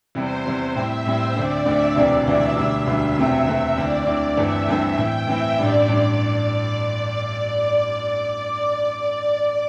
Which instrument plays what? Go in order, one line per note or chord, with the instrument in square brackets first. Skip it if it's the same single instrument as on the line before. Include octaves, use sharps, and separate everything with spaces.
[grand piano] E2 C3 G3 [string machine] C5
[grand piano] E2 C3 G3
[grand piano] A2 G3 C4 E4 [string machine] E5
[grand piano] A2 G3 C4 E4 [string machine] C5
[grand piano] D2 D3 A3 C4 [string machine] D5
[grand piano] D2 D3 A3 C4 [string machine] E5
[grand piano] E1 D2 C3 E3 C4 [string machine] D5
[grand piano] E1 D2 C3 E3 C4 [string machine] E5
[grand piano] E1 D2 D3 G3 [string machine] E5
[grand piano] E1 D2 D3 G3
E1 E2 C3 A3 C4
[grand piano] E1 E2 C3 A3 C4 [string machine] E5
[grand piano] D2 D3 C4 E4 [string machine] D5
[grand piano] D2 D3 C4 E4 [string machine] D5
[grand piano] G1 G2 E3 A3 C4 [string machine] E5
[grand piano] G1 G2 E3 A3 C4
[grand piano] A2 E3 C4 E4 [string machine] G5
[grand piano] A2 E3 C4 E4 [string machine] E5
[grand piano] A1 G2 G3 D4 [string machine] D5
[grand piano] A1 G2 G3 D4